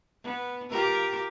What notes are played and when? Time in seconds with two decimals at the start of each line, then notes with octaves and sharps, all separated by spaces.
0.24 B3
0.70 F4 G4 A#4